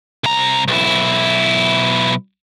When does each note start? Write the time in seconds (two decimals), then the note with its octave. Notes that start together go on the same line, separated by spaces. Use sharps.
0.24 C2 A#5
0.68 B1 E4